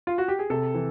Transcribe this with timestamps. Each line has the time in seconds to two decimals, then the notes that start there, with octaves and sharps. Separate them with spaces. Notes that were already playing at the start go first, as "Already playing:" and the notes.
0.07 F4
0.18 F#4
0.28 G4
0.39 G#4
0.50 C3 A4
0.74 E3